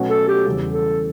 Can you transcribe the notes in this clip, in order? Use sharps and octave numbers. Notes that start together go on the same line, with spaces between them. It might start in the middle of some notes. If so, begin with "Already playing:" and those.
Already playing: B2 F#3 A3 C#4 F#4
A4
G4
E2 C#3 G3
A4